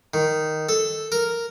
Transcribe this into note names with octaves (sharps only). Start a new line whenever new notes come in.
D#3
A4
A#4